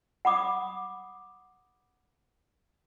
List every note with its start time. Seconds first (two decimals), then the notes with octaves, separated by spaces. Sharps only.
0.25 F#5 B5 D6 D#6